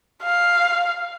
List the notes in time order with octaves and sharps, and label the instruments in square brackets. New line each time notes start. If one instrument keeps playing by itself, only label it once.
[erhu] F5